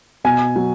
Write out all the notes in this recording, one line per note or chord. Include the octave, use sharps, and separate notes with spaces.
B2 G#5
F#3